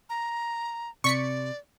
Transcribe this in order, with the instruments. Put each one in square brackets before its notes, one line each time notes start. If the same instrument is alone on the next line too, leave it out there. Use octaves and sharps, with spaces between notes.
[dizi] A#5
[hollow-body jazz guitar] C3 [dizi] D5 [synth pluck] C#6 B6 C#7